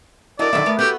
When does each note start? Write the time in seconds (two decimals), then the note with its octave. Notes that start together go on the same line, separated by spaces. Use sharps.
0.39 F#3 D4 E4 A#4 D5 D#5
0.53 F2 D3 D#3 F#3 B3 E5
0.66 A3 B3 A#4
0.79 B3 F#4 G4 A4 B4